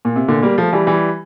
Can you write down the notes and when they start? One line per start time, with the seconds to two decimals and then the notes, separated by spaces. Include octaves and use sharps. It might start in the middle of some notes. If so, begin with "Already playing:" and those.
0.05 A#2
0.16 C3
0.28 A#2 D3
0.43 G3 A#3
0.58 F3 A3
0.73 E3 G3
0.87 E3 G3